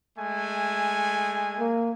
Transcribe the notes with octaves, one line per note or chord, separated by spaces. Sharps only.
G#3 A3 G#5
A#3